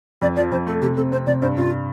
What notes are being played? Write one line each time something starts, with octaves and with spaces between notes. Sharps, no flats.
F2 D5
F3 D5
F2 C5
A3 A4
C3 G4
C4 A4
C4 C5
C3 D5
G2 C5
G2 F4